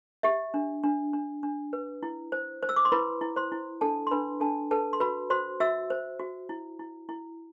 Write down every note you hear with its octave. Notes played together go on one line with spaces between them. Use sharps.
G4 E5
D4
D4
D4
D4
B4
E4
C5
C5
E6
D6
C6
E4 B4 B5
E4
C5 C6
E4
D4 A4 A5
C6
D4 B4 B5
D4 A4 A5
A4 B4 A5
C6
F#4 B4 B5
F#4 C5 C6
F#4 E5 E6
C5
F#4
E4
E4
E4